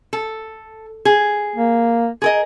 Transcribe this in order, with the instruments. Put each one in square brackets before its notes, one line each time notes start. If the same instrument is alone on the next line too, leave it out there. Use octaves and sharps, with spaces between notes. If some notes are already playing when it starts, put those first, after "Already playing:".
[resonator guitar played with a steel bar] A4
G#4
[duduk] A#3
[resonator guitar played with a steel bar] G#4 A#4 D#5